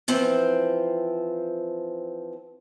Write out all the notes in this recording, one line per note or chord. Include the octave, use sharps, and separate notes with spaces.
E3 F3 C4